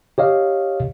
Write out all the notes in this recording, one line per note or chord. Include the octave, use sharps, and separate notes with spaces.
G4 C#5 D#5 F5